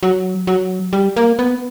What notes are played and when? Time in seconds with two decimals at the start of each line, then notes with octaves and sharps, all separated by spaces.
0.03 F#3
0.47 F#3
0.93 G3
1.16 A#3
1.39 B3